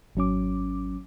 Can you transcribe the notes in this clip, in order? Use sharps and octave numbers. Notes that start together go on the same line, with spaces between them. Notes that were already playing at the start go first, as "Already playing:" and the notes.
G#1 F#3 C#4 D6